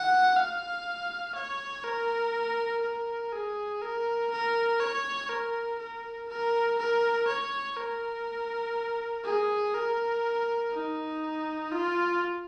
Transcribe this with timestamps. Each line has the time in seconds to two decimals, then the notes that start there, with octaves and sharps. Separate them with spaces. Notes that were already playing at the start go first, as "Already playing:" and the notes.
Already playing: F#5
0.36 F5
1.35 C#5
1.84 A#4
2.82 A#4
3.33 G#4
3.82 A#4
4.31 A#4
4.81 C#5
5.30 A#4
5.79 A#4
6.29 A#4
6.78 A#4
7.28 C#5
7.77 A#4
9.24 G#4
9.74 A#4
10.73 D#4
11.72 F4